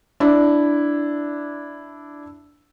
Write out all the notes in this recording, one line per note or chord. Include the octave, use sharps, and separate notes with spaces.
D4 E4